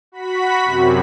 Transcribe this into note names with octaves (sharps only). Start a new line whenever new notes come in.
F#4 B5 B6
F#2 C3